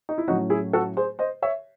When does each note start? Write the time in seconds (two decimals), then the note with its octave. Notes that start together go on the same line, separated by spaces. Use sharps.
0.09 D#4
0.18 E4
0.28 A2 F#3 A3 C#4 D#4 F#4
0.50 E4 G#4
0.73 F#4 A4
0.97 G#4 C5
1.19 C5 D#5
1.42 C#5 E5